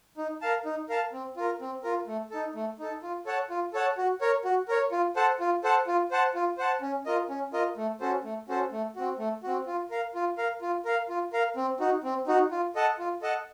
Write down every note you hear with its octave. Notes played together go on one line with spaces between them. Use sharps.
D#4
A#4 F5 A5
D#4
A#4 F5 A5
C4
F4 A#4
C4
F4 A#4
A3
D#4 A4
A3
D#4 A4
F4
A4 C#5 F#5 A5
F4
A4 C#5 F#5 A5
F#4
A#4 C#5
F#4
A#4 C#5
F4
A4 C5 F#5 A5
F4
A4 C5 F#5 A5
F4
C5 F#5 A5
F4
C5 F#5 A5
C#4
F4 A#4 D#5
C#4
F4 A#4 D#5
A3
C#4 F#4 A4 C5
A3
C#4 F#4 A4 C5
A3
C4 F#4
A3
C4 F#4
F4
A#4 F5
F4
A#4 F5
F4
A#4 F5
F4
A#4 F5
C4
D#4 F#4
C4
D#4 F#4
F4
A4 D#5 F#5 A5
F4
A4 D#5 F#5 A5